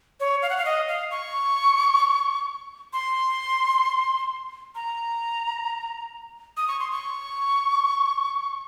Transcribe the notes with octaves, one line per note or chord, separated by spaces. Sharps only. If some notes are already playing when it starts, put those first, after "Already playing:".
C#5
F5
F#5
F5
D#5
F5
C#6
C6
A#5
D#6
C#6
C6
C#6